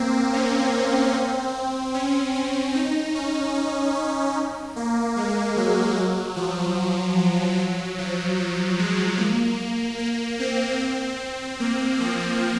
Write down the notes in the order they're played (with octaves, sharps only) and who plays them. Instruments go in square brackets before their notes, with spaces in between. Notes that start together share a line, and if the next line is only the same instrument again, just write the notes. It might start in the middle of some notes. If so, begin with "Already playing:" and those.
Already playing: [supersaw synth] A#3 C4
C#4
C4
C#4
C#4
D#4
C#4
D#4
C#4
A#3
G#3
F#3
F#3
F3
F#3
F3
F3
G#3
A#3
A#3
C4
C4
A#3
F3